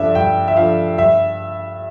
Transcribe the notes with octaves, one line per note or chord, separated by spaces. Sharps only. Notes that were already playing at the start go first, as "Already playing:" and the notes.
Already playing: G2 F3 A3 D4 E5
G2 G5
E5
F3 A3 D4 F5
G2 E5